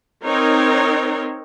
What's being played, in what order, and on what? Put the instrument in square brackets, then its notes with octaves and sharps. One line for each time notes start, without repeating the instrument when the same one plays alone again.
[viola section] C4 D#4 A#4 C#5